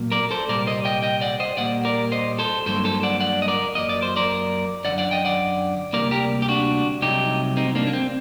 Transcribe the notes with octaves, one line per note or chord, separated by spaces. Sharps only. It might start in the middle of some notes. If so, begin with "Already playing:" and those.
Already playing: A#2 F#3 A#3
A#4 D5
A4 C5
C2 A#2 G3 A#3 A#4 D5
C5 D#5
D#5 G5
D#5 G5
D5 F#5
C5 D#5
A#2 G3 A#3 D5 F#5
A#4 D5
C5 D#5
A4 C5
G2 D3 F#3 A#3 A4 C5
A4 C5
D5 F#5
D5 F#5
D#5
A#4 D5
F#2 F#3 A#3 D#5
D5
C5
A#4 D5
F#2 D3 F#3 D5 F#5
D5 F#5
D#5 G5
D5 F#5
D2 C3 G3 A#3 A#4 D5
G4 A#4
G4
D4 F#4
C2 C3 F#3 A3 D#4 G4
C4 D#4
A#3 D4
A#3
C4